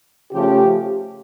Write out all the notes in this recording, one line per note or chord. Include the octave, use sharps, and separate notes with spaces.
C#3 F3 A3 C#4 G4